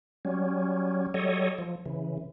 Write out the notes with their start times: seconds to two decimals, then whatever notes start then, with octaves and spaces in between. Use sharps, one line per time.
0.25 F#3 G3 C#4
1.14 F#3 G3 A4 C#5 D#5
1.58 F3
1.86 C#3 E3